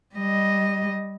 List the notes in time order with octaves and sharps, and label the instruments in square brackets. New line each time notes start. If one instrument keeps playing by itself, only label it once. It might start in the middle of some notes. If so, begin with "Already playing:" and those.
[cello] G3 D#5